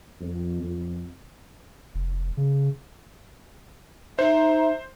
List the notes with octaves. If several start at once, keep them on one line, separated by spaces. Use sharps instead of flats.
F2
F2
F1
C#3
D#4 C5 E5